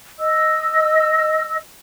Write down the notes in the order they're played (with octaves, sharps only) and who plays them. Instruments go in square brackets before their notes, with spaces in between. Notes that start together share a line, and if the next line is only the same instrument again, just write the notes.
[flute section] D#5 E6